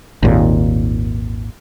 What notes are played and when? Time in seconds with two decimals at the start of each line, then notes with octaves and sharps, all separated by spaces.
0.23 G#1 D#2 A#2